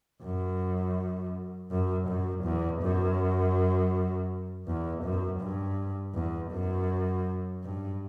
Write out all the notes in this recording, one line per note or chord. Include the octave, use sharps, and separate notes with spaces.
F#2
F#2
F#2
E2
F#2
E2
F#2
G2
E2
F#2
G2